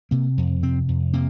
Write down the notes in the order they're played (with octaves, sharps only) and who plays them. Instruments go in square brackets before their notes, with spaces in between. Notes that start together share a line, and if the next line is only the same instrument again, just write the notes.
[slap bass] C3 A#3
F2
C3 C4
F2
C3 A#3